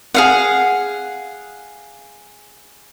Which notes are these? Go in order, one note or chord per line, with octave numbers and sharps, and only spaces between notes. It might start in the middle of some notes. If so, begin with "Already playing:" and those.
G#4 F5 F#5